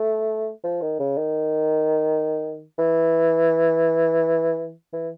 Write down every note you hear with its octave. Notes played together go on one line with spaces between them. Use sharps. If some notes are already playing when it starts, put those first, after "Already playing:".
Already playing: A3
F3
D#3
C#3
D#3
E3
E3